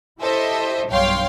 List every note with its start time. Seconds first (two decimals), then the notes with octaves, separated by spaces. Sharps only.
0.20 E4 G4 A4 C5 D#5 E5
0.88 B1 G2 C#5 F5 G5 C6